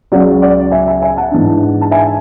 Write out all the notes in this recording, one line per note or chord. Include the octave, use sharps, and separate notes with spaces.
C#2 C#3 F#3 D5 F#5
D5 F#5
E5 G#5
E5 G#5
E5 G#5
F#5 A5
G#2 E3 G#3 D4
A5
E5 G#5